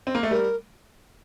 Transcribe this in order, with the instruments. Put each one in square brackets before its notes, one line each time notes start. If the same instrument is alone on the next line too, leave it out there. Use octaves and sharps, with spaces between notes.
[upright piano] C4
A#3
A3
[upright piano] G3 [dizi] A#4